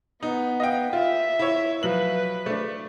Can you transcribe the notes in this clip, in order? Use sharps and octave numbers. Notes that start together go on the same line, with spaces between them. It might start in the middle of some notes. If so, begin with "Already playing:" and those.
B3 D#4
D#5 F5 G5
F4 E5
E4 C#5
F3 F#3 B4 F#7
A3 D4